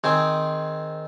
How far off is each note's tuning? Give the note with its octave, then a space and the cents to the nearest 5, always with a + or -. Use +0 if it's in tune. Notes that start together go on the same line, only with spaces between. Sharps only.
D#3 +0 C4 +0 G#4 +0